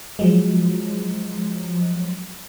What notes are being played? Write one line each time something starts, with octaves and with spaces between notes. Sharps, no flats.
F3 F#3 G#3